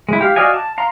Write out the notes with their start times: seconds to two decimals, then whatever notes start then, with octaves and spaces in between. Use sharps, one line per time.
0.09 G#3 E4
0.21 G4 F5
0.36 F#4 D5 D#5 F5 G#5
0.54 A5
0.78 F5 A#5 C6